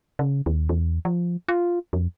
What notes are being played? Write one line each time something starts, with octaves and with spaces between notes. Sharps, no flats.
C#3
D#2
E2
F3
F4
F2